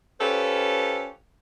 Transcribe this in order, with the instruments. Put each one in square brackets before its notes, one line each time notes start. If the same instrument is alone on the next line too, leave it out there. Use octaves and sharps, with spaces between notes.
[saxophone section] C#4 F4 G4 A4 B4 C5